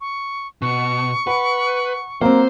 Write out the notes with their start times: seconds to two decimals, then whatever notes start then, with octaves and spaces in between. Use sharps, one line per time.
0.01 C#6
0.62 B2 C#6
1.27 B4 F#5 B5
2.21 F#3 A#3 C4 C5